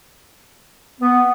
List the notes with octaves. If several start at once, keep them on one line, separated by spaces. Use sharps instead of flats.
B3